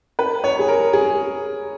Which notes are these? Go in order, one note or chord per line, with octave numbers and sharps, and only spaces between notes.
B4
C#5
G#4
A#4
G#4